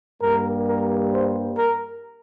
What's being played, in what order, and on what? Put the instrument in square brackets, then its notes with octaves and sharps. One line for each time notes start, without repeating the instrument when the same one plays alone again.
[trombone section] G2 G3 A#3 A#4
A#4
C5
A#4